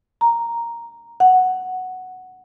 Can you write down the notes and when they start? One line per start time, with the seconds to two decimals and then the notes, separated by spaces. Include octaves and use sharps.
0.21 A#5
1.20 F#5